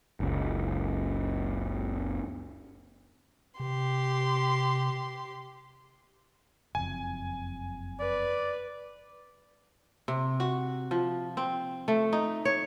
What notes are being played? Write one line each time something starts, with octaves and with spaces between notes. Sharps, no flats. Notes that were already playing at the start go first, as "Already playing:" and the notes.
F#1 C#2
C3 G4 C6
F#1 F2 G#5
B4 D5
C3
F#4
F3
C4
A3
D#4
C#5